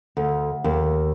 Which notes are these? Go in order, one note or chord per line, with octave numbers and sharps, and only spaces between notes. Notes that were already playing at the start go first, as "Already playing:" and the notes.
D2
D#2